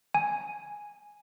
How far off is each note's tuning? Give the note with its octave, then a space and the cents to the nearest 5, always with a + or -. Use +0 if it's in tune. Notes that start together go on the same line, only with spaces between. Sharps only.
G#5 -5